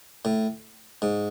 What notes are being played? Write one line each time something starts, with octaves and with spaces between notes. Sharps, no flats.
A2
G#2